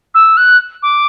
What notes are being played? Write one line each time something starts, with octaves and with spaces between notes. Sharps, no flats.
E6
F#6
D6